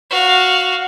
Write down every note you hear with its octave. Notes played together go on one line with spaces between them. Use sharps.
F#4 F5